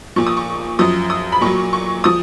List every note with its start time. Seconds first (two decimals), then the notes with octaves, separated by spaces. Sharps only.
0.16 A#2 F3 C#6
0.27 D#6
0.37 C#6
0.79 F#2 F3 D#6
1.10 D#6
1.32 B5
1.41 A#2 F#3 C#6
1.73 C#6
2.04 F3 D#6